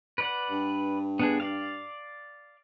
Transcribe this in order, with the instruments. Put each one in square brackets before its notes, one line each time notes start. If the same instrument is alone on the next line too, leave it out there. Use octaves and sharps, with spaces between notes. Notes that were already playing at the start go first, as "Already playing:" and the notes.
[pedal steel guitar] B4 D5 F#5
[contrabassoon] G2
[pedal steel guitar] B3 D4 G#4
D5 F5